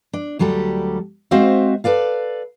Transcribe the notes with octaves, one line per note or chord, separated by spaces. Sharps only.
D4
D2 F#3 G3 G4 A4
G#3 C4 F#4 C5 E5 F5
A4 B4 D5 F5